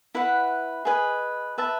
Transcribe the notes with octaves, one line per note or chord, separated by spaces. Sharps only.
E4 B4 F#5
G#4 B4 D#5 G#5
B4 E5 A5